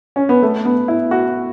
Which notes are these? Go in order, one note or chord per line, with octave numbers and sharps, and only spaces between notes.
C#4
B3
A3
B3
E4
F#4